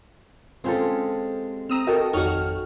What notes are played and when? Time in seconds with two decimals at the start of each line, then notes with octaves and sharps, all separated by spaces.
0.64 G#3 C4 C#4 F4 G4 A4
1.69 C4 A#5 D#6 E6
1.87 F#4 A4 A#4 D#5 G5
2.13 G#1 F2 D#4 F#4 C#5 F6